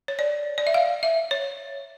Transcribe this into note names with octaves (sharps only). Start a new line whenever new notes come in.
C#5
D5
D5
E5
F5
E5
C#5